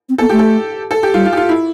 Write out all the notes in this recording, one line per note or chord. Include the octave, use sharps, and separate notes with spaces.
C4
B3 A4
A3 G4
A4
A4
G4
G3 F4
F4
G4
F4
E4